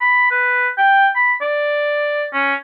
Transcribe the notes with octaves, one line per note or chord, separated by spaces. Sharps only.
B5
B4
G5
B5
D5
C#4